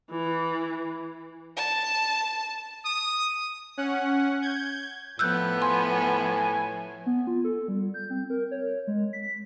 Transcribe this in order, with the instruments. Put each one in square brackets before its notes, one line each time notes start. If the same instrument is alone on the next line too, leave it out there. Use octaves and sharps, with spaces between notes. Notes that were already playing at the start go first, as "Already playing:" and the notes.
[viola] E3
[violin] A5
[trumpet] D#6
[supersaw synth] C#4 F#5
G6 G#6
[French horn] A2 [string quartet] F3 B3 [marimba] E6 F#6 G6
[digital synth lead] G#5 [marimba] C6
[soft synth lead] B3
F4
A4
G3
G6
C4
A#4
C#5
G#3
B6